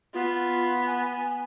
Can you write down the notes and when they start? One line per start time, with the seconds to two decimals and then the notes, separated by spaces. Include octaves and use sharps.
0.14 B3 F4
0.87 G#5